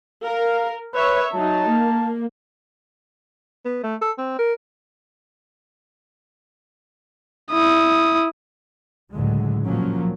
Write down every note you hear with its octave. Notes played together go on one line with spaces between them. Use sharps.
A#4 F5
B4 C#5 E5
F#3 D#4 A5
A#3
B3
A3
A4
C4
A#4
E4 D#6
C#2 A2 D3 F#3 G#3
A#2 F3 F#3 A#3 C#4